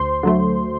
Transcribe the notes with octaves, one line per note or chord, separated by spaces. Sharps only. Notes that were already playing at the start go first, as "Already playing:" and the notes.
Already playing: D2 C5 C6
D3 F#3 A3